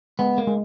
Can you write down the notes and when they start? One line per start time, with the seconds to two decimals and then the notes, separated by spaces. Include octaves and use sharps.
0.19 G#3 B3
0.38 A#3
0.47 G#3